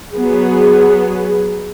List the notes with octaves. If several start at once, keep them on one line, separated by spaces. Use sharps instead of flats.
F#3 B3 G#4